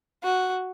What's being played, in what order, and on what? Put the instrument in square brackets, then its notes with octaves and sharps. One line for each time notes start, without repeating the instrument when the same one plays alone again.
[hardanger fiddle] F#4